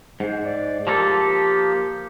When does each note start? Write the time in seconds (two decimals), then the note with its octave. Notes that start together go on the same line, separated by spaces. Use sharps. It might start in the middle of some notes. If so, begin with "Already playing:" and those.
0.20 G#2 C5
0.45 D5
0.87 F3 A#3 G4 A4